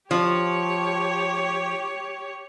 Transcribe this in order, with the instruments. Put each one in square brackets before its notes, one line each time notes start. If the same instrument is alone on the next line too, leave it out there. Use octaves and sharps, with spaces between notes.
[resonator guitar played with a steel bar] F3 [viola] G4 C#5